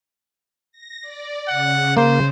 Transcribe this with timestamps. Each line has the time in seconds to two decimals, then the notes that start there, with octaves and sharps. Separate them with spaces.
0.72 A#6
1.02 D5
1.48 C#3 F#5
1.97 A#3 C5